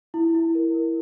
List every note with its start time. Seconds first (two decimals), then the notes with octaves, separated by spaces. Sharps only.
0.14 E4
0.34 E4
0.55 A#4
0.75 A#4